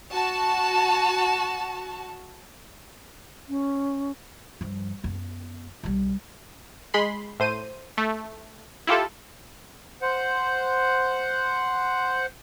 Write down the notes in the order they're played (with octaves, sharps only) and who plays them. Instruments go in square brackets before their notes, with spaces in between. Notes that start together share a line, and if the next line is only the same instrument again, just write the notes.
[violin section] F#4 A5
[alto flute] C#4
[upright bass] G2 F3
F#2 B3
B1 G3
[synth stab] G#3 B5 C6
A2 C5 D#7
A3
E4 F4 G4 A4
[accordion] C5 F#5